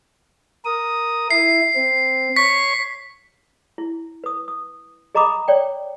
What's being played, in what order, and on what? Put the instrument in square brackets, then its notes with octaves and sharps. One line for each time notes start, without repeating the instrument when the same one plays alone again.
[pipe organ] A#4 D#6
[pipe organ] E4 [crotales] C7
[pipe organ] C4
[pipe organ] C#5 C#6 [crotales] B6
[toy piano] E4
B4 D#6
D#6
G#4 D#5 A#5 B5 D6 D#6
C#5 D5 G5